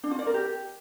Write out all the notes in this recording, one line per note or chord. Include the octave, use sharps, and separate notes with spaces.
D4
F4
D5
A#4
G4